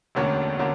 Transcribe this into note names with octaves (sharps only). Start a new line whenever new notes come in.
E1 D2 D3 A#3 C#4
D3 A#3 C#4